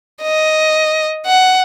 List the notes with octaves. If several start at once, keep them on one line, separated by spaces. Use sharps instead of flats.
D#5
F#5